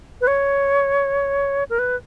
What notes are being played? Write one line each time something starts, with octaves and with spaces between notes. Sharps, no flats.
B4
C#5
A#4
B4